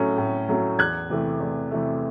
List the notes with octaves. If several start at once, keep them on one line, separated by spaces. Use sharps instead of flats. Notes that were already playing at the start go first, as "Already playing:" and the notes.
Already playing: A2 F#3 A3 C#4
A2
F#3 A3 C#4
E2 F#6 G#6
C3 E3 A3
E2
C3 E3 A3